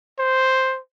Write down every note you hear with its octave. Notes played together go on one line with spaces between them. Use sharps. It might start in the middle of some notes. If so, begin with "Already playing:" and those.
C5